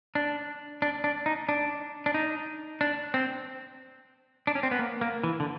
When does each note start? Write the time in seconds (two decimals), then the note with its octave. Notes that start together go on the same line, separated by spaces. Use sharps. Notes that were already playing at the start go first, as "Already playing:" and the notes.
0.15 D4
0.82 D4
1.04 D4
1.26 D#4
1.49 D4
2.06 D4
2.14 D#4
2.81 D4
3.14 C4
4.47 D4
4.55 C#4
4.63 C4
4.71 B3
4.79 A#3
5.01 A#3
5.24 E3
5.40 D3